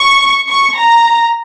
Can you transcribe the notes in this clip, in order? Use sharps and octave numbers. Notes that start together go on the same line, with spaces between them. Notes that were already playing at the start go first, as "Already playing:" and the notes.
Already playing: C#6
C#6
A#5